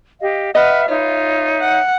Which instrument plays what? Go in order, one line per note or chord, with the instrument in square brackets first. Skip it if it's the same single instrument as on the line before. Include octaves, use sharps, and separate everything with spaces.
[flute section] G4 D#5 F5
[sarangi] B4 [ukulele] D#5 [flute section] E5 F#5 F6
[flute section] D#4 C#5 E5 [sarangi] F4
[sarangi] F#5